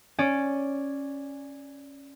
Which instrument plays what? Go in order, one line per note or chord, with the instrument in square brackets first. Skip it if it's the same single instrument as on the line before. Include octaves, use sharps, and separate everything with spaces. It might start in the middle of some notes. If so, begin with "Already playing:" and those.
[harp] C#4 D5